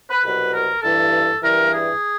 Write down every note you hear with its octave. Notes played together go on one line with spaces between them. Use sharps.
B4
C2 B2 F#3 B4
A#4
G2 E3 A4
G2 E3 A#4
G#4